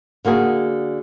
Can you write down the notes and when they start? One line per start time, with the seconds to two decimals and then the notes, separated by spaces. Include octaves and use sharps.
0.25 D3 A#3 F#4 G#4